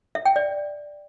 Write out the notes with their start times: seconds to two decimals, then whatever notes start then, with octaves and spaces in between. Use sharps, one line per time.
0.15 E5
0.25 G5
0.36 D5